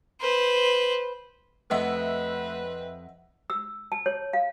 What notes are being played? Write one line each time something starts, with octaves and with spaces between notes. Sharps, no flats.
B4 C5
F2 A3 C4 B4 D#5 E5 F#5
E6
A5
C#5
F5